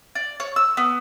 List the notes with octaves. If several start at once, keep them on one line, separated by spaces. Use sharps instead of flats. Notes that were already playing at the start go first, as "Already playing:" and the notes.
D5
C#5
E6
B3